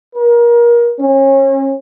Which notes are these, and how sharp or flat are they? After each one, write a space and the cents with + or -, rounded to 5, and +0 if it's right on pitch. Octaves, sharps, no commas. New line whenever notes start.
A#4 +30
C#4 -30